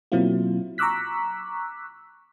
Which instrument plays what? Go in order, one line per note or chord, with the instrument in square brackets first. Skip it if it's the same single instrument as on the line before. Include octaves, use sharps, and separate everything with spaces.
[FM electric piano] B2 F#3 A#3 C4 E4 F4
A#5 C#6 D6 E6 F#6 B6